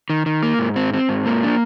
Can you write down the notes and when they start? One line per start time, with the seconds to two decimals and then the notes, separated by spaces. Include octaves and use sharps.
0.10 D#3
0.26 D#3
0.43 A#3
0.59 G#2
0.76 C4
0.94 C4
1.09 G#2
1.26 A#3
1.43 D4